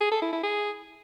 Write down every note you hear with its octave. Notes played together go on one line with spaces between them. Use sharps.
G#4
A4
E4
E4
G#4